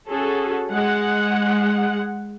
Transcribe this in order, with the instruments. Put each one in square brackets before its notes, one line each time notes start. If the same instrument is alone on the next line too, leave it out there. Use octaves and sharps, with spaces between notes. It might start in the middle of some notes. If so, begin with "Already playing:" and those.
[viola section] C#4 F#4 G#4 A4
G#3 F#5